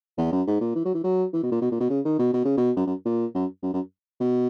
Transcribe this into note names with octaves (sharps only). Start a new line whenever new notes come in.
E2
F#2
G#2
A#2
E3
F#3
E3
F#3
E3
B2
A#2
B2
A#2
B2
C#3
D#3
B2
B2
C#3
B2
F#2
F#2
A#2
F#2
F#2
F#2
B2